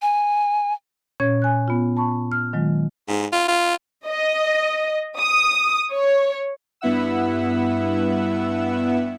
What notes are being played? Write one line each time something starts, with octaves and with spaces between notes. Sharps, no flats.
G#5
A#2 C#4 C#5 G#6
G#5 F#6
B3 F4
A5 B5 C#6
F6
D#3 F#3 G#3 F4
G#2
F4
F4
D#5
D#6
C#5
G2 B3 E4 E5 F#5 E6